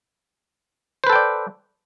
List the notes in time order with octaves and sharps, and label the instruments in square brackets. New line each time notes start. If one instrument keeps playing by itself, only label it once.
[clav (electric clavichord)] C5
B4
A4
G5
D5